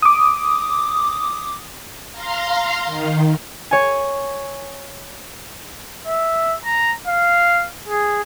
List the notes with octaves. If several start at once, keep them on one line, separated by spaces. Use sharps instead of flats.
D6 D#6
F5 A#5 C6
D#3
C#5 G#5
E5
A#5
F5
G#4